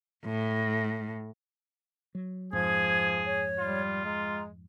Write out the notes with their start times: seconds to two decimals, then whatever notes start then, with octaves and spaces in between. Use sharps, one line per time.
0.25 A2
2.15 F#3
2.53 F2 G#2 F3 G#4 G#6
3.26 C#5
3.59 G3 F4
4.05 G#3 A#5